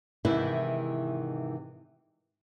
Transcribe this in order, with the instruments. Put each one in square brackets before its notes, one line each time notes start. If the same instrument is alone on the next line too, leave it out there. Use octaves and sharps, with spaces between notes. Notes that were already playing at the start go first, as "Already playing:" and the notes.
[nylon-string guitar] G#2 C3 D#3 E3 E4